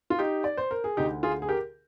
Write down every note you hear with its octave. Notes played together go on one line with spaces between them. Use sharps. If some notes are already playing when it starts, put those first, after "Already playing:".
F4
D#4 G4
D5
C5
A#4
G#4
D2 D3 D#4 G4
F4 G#4
G#4
G4 A#4